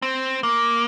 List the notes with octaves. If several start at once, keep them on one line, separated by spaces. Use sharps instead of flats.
C4
A#3